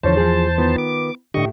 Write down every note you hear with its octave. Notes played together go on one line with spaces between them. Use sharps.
E2 D3 F3 C5 C#5 A5
F3 G#4
D#3 B3 F4
D6
A2 D3 G4 D#5 C#6